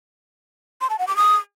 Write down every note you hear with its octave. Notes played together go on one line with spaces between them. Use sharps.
C6
A5
F#5
D6
D#6